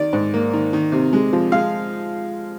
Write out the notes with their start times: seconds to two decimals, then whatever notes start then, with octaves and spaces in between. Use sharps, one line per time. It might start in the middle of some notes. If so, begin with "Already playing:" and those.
Already playing: D#3 D5
0.13 G#2
0.34 A#3
0.53 D#3
0.73 D#3
0.92 C3
1.13 G#3
1.33 F3
1.52 G#3 F5